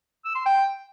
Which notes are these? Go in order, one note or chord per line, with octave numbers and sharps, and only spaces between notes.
E6
C6
G5